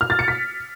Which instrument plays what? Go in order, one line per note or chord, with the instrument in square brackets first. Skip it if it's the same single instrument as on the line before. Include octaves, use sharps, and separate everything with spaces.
[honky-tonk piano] F6
A6
C#7
B6